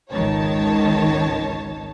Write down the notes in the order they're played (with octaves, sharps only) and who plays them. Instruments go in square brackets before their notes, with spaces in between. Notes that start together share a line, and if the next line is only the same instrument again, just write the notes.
[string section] G#1 C#2 D#3 C#5 A5